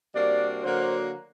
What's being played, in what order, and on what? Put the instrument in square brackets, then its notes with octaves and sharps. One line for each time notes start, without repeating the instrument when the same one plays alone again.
[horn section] C3 G3 A#3 D4 F#4 [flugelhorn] D5
[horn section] D3 F#3 A#3 F#4 [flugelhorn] C5